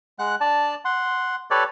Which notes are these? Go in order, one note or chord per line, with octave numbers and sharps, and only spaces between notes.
G#3 F#5 F#6
D4 D5 A5
F#5 C6
G4 A4 B4 C#5 D5